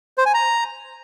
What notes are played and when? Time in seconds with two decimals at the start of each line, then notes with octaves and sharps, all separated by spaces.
0.18 C5
0.26 G#5
0.34 A#5